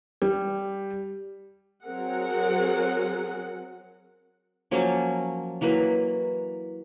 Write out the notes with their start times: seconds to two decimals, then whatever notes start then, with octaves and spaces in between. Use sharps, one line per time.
0.22 G3
1.85 F#3 C4 G#4 A#4 F#5
4.71 F3 F#3 A#3 C#4
5.61 E3 F#3 A#3 B4